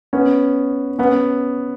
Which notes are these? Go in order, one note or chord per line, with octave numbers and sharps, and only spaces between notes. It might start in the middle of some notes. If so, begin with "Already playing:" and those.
B3 C#4
B3 C#4